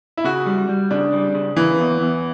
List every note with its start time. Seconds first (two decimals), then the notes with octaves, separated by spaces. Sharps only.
0.17 E4
0.25 C#3 F#4
0.46 G3
0.69 G3
0.91 C#3 D4
1.13 G3
1.35 C#3
1.56 E3 A#3
1.79 E2
2.01 E2